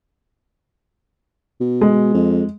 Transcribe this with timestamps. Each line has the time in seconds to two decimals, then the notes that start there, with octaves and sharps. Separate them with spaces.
1.61 B2
1.81 G#3
2.14 F2